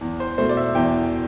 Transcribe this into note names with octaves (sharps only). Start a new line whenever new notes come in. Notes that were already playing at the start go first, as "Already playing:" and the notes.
E2
C5
B2 A3 C5
D5
E5
E2 G5